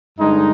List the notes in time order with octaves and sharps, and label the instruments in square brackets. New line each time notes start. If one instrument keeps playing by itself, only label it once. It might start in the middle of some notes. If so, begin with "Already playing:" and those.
[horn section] G2 D3 G#3 D#4